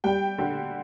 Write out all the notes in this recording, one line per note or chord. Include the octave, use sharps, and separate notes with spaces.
G3 G5
D3